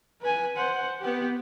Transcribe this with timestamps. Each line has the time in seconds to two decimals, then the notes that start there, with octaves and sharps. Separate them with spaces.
0.21 B4 G#5
0.57 C5 F#5
1.01 B3 G4